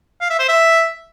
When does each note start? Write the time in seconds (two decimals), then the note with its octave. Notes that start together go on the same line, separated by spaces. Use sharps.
0.21 F5
0.30 E5
0.39 C5
0.48 E5